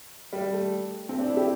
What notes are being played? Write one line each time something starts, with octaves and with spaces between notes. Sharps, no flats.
G3
A3
C4
D4
E4
G4